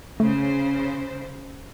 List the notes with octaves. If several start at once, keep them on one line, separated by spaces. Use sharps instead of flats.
C#3 A3 C5